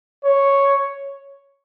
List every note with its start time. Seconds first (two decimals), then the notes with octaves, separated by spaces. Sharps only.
0.25 C#5